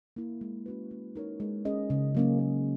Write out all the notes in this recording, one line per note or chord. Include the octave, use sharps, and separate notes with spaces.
A#3 E4
G#3
C#4 F#4 B4
A#3
D#4 A#4 C#5
G#3
C#4 G#4 D#5
C#3
F#3 A#3 C#4
A#3